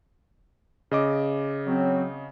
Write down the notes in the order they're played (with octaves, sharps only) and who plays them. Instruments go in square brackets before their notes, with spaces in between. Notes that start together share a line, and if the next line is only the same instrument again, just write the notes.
[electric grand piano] C#3 D#5 D6
[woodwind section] F#3 C4